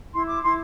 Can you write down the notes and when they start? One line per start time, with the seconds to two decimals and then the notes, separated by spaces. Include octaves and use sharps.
0.13 E4 C6
0.28 D6
0.43 E4 C6